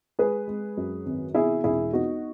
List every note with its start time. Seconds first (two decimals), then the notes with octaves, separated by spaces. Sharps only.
0.19 G#3 G#4 B4
0.48 G#3
0.77 F#2
1.06 G#1
1.35 B2 E4 G#4
1.64 E1 E4 G#4
1.93 B3 D#4 F#4